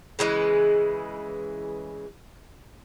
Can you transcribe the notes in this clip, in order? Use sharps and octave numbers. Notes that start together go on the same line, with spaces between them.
C#3 E3 G#3 B4